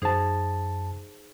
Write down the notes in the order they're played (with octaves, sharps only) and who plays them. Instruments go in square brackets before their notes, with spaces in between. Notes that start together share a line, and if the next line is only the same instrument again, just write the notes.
[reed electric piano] F#2 A5 [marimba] D#4 G#4 C5